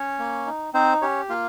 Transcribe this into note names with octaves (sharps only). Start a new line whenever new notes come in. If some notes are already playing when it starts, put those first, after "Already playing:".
Already playing: C#4 C#5
A#3
D#4
C4 D#4 C5
C#4 G4 C#5
A#3 F4 F5